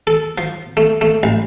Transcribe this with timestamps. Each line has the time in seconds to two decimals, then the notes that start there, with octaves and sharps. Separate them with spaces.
0.07 A4
0.38 F3
0.77 A3
1.01 A3
1.23 A1